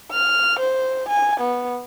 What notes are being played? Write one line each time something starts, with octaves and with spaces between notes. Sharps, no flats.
F6
C5
G#5
B3